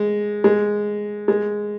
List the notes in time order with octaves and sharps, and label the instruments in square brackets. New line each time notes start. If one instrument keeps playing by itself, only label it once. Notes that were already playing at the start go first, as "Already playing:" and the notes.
Already playing: [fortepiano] G#3
G#3
G#3